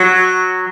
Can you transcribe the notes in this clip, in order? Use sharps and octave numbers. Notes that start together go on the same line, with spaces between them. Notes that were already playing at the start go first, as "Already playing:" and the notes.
Already playing: F#3